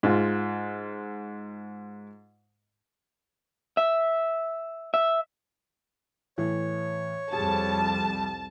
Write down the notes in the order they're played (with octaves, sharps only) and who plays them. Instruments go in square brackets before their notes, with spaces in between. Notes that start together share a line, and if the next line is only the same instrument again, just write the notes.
[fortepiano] G#2 F4
[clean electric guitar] E5
E5
[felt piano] A2 E3 [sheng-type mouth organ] C#5
[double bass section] C2 F2 G3 [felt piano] G#4 [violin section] A5